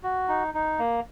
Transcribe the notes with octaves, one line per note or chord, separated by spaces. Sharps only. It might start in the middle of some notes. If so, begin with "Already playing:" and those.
F#4
D#4
D#4
A#3